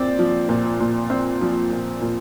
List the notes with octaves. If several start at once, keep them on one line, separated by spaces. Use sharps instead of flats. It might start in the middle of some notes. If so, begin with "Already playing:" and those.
Already playing: A#2 C4 D5
F3
A#2
A#2
C4
F3
A#2
A#2